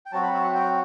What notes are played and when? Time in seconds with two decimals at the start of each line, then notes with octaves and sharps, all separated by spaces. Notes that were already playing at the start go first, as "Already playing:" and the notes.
0.06 G5
0.12 F#3 C4 F#4 A5
0.23 B5
0.34 E5
0.44 F#5
0.54 G5